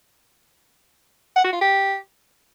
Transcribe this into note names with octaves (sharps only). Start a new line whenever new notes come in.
F#5
F#4
F4
G4